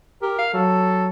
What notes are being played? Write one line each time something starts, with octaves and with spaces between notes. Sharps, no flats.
G4 A#4
F5
F#3 A4